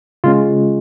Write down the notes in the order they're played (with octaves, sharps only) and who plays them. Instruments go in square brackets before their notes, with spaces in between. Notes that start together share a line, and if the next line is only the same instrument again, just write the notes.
[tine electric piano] C#3 G#3 C#4 F4